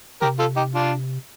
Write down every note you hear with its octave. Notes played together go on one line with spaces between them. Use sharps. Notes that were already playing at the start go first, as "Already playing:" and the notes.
C3 G4 A#4
F4 A4
D#4 G4
D4 F4